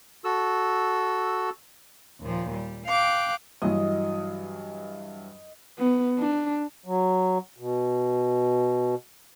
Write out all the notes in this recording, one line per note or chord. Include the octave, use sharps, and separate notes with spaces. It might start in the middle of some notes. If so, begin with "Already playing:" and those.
F#4 A4 E6
D#2 A#2 F3
G3
F5 G5 D6 F#6
G2 E3 F#3 D#5
B3
D4
F#3
B2